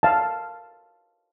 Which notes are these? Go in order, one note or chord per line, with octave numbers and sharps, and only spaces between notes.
F5 A5